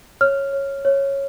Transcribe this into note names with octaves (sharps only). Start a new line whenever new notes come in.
C#5 F6
C#5
C#5